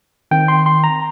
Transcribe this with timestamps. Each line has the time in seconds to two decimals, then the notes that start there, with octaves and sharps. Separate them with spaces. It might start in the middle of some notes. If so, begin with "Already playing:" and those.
0.31 D#3 C4 G5
0.48 C6
0.66 C6
0.84 A#5